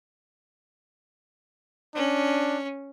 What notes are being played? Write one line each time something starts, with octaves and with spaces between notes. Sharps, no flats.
C#4 D4